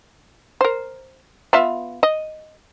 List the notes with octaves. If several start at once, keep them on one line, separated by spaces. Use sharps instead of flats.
A#4 C5
B3 F4 E5
D#5